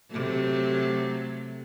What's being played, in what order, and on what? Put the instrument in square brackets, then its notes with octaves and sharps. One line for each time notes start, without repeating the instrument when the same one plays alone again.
[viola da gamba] C3 F#3 A3